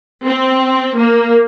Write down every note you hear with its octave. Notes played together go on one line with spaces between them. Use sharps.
C4
A#3